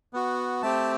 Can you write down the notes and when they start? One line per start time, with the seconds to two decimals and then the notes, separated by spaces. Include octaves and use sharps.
0.13 B3 F#4
0.62 A3 C4 G4 A5